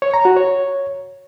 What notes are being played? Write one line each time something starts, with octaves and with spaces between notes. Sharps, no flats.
C#5
A#5
F#4
C#5